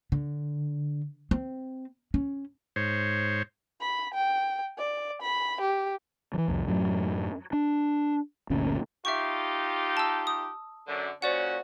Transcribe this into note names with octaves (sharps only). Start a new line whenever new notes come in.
D3
C4
C#4
G#2 C5 C#5
B5
G5
D5
B5
G4
E3 F3
C2 F2
F#2 A2 F#3
D4
G1 D2 A#2 C#4
D#4 F4 G4 E5 C#6
A5 E6
D#6
F#2 D3
A#2 C#4 F#4 C5 D5 F#5